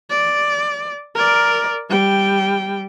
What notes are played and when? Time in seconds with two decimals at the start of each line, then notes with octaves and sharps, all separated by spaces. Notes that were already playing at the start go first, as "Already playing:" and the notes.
0.10 D5
1.15 A#4 D5
1.89 G3 G5